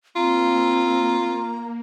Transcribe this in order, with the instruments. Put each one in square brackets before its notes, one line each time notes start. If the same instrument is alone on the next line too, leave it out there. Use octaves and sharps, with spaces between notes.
[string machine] A#3 [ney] C4 [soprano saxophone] F4 [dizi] A#5